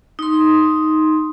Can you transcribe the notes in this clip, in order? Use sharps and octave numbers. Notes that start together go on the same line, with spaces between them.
D#4 C6